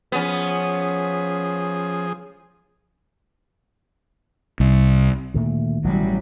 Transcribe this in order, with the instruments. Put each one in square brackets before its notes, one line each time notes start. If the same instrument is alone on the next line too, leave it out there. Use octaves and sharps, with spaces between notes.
[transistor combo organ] F3 G#4 [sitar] B3 C#4
[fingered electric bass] C2
[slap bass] D2 A#2 A3 [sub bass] D#3
[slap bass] A1 B2 [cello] F#3 G3